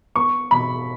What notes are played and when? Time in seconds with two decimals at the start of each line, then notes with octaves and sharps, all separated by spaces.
0.16 B3 C#6
0.51 B2 B5